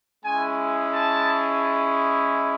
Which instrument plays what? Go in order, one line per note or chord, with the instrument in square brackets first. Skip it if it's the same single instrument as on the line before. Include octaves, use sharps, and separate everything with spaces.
[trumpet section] G#3 C#4 E4 G#5
A5